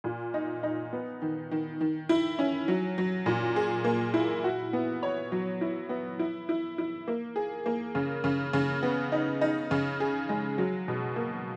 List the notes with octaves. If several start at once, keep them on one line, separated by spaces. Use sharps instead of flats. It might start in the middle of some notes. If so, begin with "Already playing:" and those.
A#2
D#4
D#4
B3
D#3
D#3
D#3
E4
C#4
F#3
F#3
A#2
G#4
A#3
E4
F#4
B3
C#5
F#3
E4
B3
E4
E4
E4
A#3
G#4
A#3
C#3
C#3
C#3
B3
D#4
D#4
C#3
G#4
G#3
F#3
B2
A#3